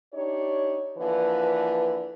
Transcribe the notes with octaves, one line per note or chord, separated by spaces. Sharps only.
D4 D#4 G4 C#5
D3 E3 F3 A#3 B4